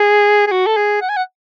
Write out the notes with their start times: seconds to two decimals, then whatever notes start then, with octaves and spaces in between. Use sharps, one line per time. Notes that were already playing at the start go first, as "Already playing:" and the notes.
Already playing: G#4
0.47 G#4
0.51 F#4
0.67 A4
0.77 G#4
1.02 F#5
1.09 G#5
1.17 F#5